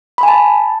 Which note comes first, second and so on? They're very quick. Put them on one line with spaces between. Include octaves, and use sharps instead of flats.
B5 G#5 A5